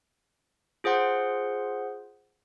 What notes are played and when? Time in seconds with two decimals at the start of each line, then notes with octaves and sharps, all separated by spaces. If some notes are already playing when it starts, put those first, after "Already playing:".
0.84 F4 G#4 C5 F#5 C6